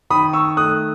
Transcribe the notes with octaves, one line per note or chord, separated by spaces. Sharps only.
D#3 B5 D#6
C#6 E6
A3 D#6 F#6